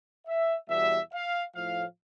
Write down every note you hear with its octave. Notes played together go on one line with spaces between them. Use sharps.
E5
E2 B2 G3 E5
F5
A2 F3 F5